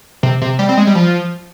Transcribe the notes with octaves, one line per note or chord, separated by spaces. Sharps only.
C3
C3
G3
C4
G#3
G3
F3